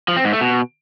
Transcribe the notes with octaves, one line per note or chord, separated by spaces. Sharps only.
F3
C4
G#2
A3
B2